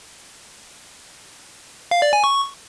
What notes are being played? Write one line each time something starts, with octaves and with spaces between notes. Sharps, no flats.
F5
D5
G#5
C#6